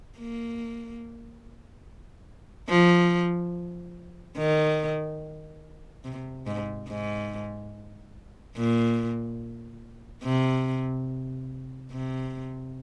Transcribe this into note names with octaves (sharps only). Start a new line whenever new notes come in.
A#3
F3
D#3
C3
G#2
G#2
A#2
C3
C3